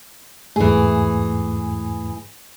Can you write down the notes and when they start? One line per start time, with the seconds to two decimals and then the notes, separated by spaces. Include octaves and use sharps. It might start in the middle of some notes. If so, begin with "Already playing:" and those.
0.56 E2 G#2 E3 A3 G#4